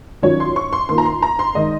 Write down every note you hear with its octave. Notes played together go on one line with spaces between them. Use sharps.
D#3 F#3 C#4 F4 C#5
C6
C#6
C6
D#3 A#3 F4 C6
A#5
C6
A#5
C6
D#3 G#3 D#5